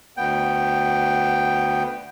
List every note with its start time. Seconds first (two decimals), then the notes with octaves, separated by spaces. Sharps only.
0.17 D2 B3 G5